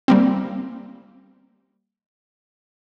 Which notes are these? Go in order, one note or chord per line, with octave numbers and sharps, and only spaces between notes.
G3 A#3 C4